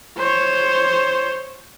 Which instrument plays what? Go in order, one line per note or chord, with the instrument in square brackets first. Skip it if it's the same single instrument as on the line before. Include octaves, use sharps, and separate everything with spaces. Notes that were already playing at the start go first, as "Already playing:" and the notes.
[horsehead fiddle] C5 C#5